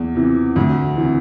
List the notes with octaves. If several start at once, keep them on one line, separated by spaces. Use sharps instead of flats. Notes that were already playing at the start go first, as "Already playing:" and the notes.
Already playing: E2
C3 E3
D2
C3 E3